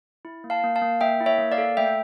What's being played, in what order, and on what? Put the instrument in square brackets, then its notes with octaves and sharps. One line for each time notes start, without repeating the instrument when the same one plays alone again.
[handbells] E4
A#3
F5 A5
A#3
F5 A5
A#3
A#3 E5 G5
E4
C#5 E5
A#3
D5 F5
A4
A3 E5 G5